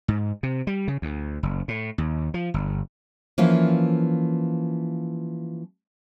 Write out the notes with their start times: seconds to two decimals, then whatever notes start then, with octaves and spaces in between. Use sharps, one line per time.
0.08 G#2
0.43 C3
0.67 G3
0.88 C#3
1.02 D2
1.43 F#1
1.68 A2
1.98 D#2
2.34 F3
2.54 G1
3.38 E3 F3 A#3 C#4